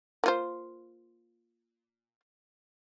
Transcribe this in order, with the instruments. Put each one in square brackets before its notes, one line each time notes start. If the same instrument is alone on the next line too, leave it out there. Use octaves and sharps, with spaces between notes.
[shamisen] A#3 F4 C5